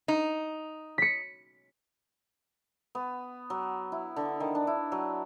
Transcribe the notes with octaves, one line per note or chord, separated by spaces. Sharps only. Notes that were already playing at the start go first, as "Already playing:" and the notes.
D#4
B6 C#7
B3
F#3
E4
D3
D#3
D4
E4
F#3